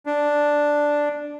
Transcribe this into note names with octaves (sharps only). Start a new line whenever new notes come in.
D4